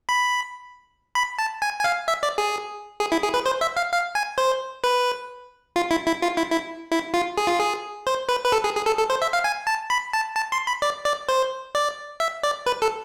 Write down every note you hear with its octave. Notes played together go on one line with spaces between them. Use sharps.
B5
B5
A5
G#5
G#5
F5
E5
D5
G#4
G#4
E4
G#4
B4
C5
E5
F5
F5
G#5
C5
B4
F4
E4
E4
F4
E4
E4
E4
F4
G#4
F4
G#4
C5
B4
B4
A4
G#4
G#4
A4
A4
C5
E5
F5
G#5
A5
B5
A5
A5
C6
B5
D5
D5
C5
D5
E5
D5
B4
A4